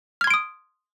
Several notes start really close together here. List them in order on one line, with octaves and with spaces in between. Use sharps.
F6 G#6 C6 D7 D#6